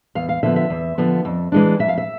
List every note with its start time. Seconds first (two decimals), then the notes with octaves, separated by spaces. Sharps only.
0.15 E2 F5
0.29 F5
0.43 D3 F3 B3 E5
0.56 E5
0.70 E2
0.98 D3 F3 B3
1.25 F2
1.52 E3 G#3 D4
1.79 F2 E5
1.88 F5
1.98 E5